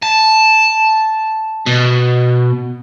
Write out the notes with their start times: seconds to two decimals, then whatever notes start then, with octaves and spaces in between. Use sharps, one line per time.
0.02 A5
1.66 B2